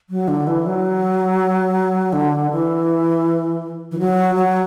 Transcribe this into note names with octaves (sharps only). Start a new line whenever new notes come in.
F#3
D3
E3
F#3
D3
E3
E3
F#3
F#3